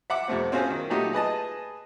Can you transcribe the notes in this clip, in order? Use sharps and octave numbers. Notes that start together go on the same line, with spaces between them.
E5 F#5 D6
F2 C3 A3 C4
C4 C#4 F4 F#4 G#4 C5
D#3
A#2 F#3 A3 D#4 F#4 G4
G#4 B4 D#5 A5